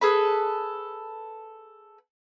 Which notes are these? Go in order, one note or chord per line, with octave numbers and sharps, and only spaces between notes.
G#4 A4 B4 B5